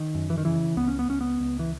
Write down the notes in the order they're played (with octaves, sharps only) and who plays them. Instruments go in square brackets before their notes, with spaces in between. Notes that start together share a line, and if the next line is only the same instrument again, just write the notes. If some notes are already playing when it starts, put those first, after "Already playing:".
Already playing: [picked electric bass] D#3
F#2
E3
D#3
C#3 E3
C#2 B3
C#4
B3
C#2 C#4
B3
C#2
E3